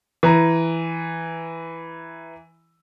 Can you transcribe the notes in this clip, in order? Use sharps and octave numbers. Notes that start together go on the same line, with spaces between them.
E3 A#5